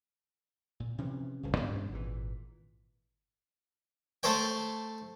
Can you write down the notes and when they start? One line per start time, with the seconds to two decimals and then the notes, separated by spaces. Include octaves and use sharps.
0.80 A#2
0.98 C3 E3 F3 C#4
1.43 D1 G#1 G2 C#3
1.57 G2 B2 C#4 D4
1.91 G#1 A#2 D3 E3
4.23 A3 A4 C5 C#5 G5